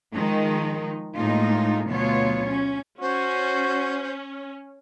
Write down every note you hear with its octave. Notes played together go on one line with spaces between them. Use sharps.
D#3 F3 G#3 D#4
A2 G#3 A#3 D#4 F4
D2 B2 F#3 B3 F4 C#5
C#4
C#4 F#4 C5